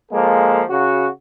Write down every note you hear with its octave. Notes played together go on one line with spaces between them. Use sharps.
F3 G#3 A#3 A4
C#3 F#4